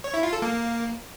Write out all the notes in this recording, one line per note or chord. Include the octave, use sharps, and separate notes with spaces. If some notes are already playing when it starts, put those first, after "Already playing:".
C#5
E4
F4
A4
A#3